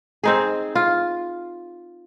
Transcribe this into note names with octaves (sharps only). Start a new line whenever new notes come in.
C4 D#4 G#4
F4